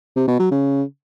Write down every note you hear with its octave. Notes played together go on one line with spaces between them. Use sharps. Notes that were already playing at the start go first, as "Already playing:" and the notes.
C3
B2
F#3
C#3